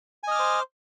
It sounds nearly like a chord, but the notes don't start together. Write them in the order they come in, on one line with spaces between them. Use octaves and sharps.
G#5 D#5 F6 D6 C5